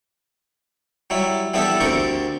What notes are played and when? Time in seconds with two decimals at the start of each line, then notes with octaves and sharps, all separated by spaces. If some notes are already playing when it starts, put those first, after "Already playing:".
1.10 F#3 G3 E4
1.54 G3 B3 D4 E4 G4 A4
1.80 D2 D3 C4 G4 A#4 C#6